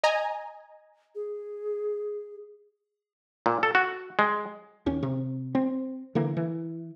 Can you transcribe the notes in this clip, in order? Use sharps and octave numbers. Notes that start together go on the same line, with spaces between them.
D#5 G#5 A#5
G#4
A#2
A4
F#4
G#3
D#2 C#4
C3
C4
D3 E3 A#3
E3